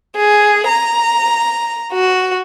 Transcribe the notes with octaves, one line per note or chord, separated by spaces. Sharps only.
G#4
A#5
F#4